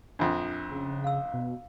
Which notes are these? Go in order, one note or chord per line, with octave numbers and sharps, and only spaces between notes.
A#1 F2 D4 F4
C#3
F5 E6
B2